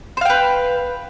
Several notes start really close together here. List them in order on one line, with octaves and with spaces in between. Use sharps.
C5 F5 G5 B4